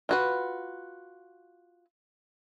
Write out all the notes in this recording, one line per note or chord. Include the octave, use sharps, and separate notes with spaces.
F4 F#4 B4